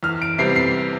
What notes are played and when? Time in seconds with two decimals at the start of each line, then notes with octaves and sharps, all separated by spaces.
0.03 E2 F6
0.22 D7
0.38 C3 G3 B3 C7
0.56 C7